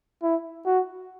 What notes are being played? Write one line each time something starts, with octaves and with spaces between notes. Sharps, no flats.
E4
F#4